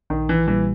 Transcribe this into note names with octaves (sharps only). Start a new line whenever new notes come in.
A#1 D#3
E3
A#2 E3 G3